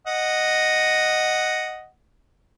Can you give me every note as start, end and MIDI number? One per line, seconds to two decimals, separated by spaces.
0.07 1.87 75
0.07 1.87 78